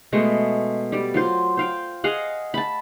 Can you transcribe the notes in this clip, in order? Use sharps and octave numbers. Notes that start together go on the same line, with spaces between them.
B2 G#3 A3
G3 D5
F#3 F4 C5
C5 F5 G5
G#4 D#5 F5 F#5
A5 B5